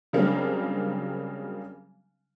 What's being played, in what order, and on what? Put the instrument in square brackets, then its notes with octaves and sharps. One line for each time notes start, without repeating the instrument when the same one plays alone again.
[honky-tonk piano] C#3 F#3 G3 A#3 C4 D4